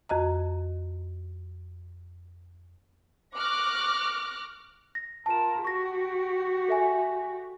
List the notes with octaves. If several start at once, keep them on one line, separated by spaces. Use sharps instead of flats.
F2 F#4 D#5 A#5
C#6 D6 F6 F#6 A#6
A#6
F4 A#4 A5 E7
F#4 G4 C#6 A#6
A4 E5 G#5